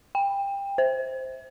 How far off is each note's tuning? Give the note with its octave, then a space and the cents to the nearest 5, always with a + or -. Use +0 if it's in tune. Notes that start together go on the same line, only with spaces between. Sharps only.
G5 +25
C5 +0